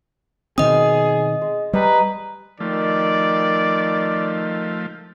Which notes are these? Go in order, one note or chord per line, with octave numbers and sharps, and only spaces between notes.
B2 D#3 C4 G#4 D#5 D#6
G#3
G3 B4 D#5 G#5 A#5
D#3 F3 A3 D5